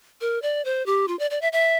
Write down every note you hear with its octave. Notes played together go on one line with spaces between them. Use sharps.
A#4
D5
C5
G4
F4
D5
D5
E5
E5